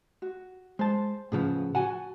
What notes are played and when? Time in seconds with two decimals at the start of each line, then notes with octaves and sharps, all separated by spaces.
0.22 F#4
0.79 G#3 C5 A5
1.32 A2 C#3 F3 G#4 B4 F#5
1.75 F#4 F#5 G#5 A5